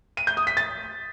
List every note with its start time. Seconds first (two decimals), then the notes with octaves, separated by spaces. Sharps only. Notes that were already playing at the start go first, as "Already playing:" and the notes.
0.17 D#7
0.27 G6
0.37 D#6
0.47 B6
0.57 A6